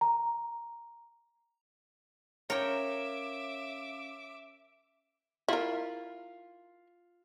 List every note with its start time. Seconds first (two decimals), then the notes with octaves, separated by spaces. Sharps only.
0.01 A#5
2.50 C#4 A#4 C#5 E5 F5 G5 D6
5.48 E4 F4 A#4